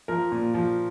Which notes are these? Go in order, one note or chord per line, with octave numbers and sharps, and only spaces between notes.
F3 A#4
A#2
F3